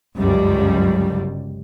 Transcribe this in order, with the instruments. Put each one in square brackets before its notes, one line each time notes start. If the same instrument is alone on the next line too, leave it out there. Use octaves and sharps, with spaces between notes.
[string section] G1 C#2 F#2 G3